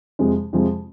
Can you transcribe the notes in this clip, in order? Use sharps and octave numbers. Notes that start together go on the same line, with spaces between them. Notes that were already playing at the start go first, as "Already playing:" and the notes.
F2 C3 F3 G#3
F2 C3 F3 G#3